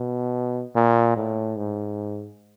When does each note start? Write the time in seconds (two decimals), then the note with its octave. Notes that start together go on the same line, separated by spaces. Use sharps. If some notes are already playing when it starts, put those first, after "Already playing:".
Already playing: B2
0.75 A#2
1.16 A2
1.57 G#2